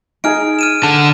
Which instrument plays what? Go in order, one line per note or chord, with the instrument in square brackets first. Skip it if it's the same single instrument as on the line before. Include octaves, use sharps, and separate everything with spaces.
[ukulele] D#4 G#4 [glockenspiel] F6 D7
[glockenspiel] F6 D#7 E7
[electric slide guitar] D3 A5